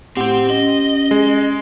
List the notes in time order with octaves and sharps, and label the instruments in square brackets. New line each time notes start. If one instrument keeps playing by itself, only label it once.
[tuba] A2 [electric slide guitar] C4 C5 [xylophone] G4 F#5
[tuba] C#4 [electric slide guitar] D#5
[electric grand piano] G#3